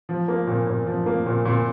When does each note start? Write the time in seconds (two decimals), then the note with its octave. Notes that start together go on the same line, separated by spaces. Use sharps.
0.09 F3
0.28 A#3
0.47 A#2
0.67 A#2
0.87 F3
1.06 A#3
1.26 A#2
1.45 A#2